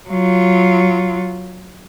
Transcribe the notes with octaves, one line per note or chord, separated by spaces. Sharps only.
F#3 F4